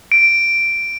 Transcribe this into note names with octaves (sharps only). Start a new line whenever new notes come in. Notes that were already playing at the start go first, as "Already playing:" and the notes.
D7